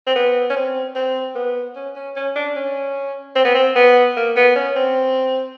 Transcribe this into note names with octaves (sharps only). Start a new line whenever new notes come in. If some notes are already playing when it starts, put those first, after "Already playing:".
C4
B3
C#4
C4
C4
B3
C#4
C#4
C#4
D4
C#4
C4
B3
C4
B3
A#3
B3
C#4
C4